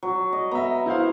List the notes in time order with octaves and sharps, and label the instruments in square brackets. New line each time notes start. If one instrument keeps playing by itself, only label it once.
[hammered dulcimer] F#3
D#5
[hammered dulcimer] B3 [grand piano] E5 A#5
[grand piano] E4 C5 F5